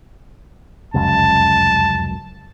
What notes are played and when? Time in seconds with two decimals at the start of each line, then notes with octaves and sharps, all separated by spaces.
0.94 F1 C#2 F#2 A5